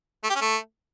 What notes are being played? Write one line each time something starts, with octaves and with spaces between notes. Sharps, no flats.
A3
G4
C#4
A3